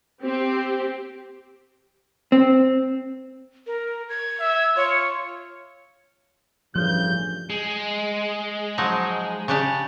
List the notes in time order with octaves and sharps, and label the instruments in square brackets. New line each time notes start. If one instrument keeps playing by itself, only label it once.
[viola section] C4 G4
[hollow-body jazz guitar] C4
[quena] A#4
G#6
[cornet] E5
[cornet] F4 [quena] C#5
[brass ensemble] A1 G2 C#3 [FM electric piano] F3 [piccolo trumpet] G6
[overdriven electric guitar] G#3
[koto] F3 F#3 D#4
C#3 D4 G4